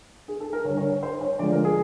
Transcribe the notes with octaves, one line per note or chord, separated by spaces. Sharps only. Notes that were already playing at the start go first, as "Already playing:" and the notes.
G#4
A4
A#4
D3 G3 C#5
C#5
C#5
C5
C#5
D3 F3 G#3 D5
A#4
G#4